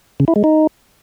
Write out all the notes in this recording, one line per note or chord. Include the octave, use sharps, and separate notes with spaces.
C#3
E4
G#3
D#4